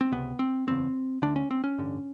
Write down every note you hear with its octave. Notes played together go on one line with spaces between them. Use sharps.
C4
C#2 C3 B3
C4
F#1 E2 C#3 C4
D2 D3 D4
C#4
C4
C#4
A1 G2 D3